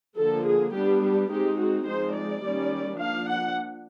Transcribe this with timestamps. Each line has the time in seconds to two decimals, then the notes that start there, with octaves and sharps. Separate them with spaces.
0.16 D3 F3 A#3 A4
0.45 G#4
0.73 G3 B3 D4 G4
1.01 G4
1.29 G#3 C4 D#4 G4
1.58 F#4
1.85 F3 G#3 C4 D#4 C5
2.13 D5
2.41 D#3 G3 A#3 C#4
2.98 F3 A#3 D4 F5
3.26 F#5